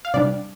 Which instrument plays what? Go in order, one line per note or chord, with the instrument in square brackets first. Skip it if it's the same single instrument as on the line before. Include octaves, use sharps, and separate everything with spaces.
[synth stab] F5
C3 G3 D4 D5